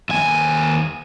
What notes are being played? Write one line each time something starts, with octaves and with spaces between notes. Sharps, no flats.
D#2 G#5